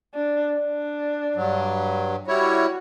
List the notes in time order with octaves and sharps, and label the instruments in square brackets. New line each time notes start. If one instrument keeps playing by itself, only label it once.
[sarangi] D4
D4
[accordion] G2 F#3
[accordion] G3 E4 C#5 [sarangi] F#4